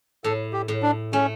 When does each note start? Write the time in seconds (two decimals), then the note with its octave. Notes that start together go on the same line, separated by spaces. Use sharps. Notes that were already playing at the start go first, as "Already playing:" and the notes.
0.24 A2 A4
0.53 G4
0.68 A2
0.82 D4
1.13 A3 C#4